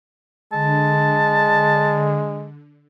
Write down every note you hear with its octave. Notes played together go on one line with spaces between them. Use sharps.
D3 G#3 A5